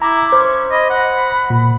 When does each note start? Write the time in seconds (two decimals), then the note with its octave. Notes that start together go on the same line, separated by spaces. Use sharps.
0.02 E4 A#5 D6
0.32 C#4 C5
0.71 D#5 B5
0.90 F#5
1.50 A#2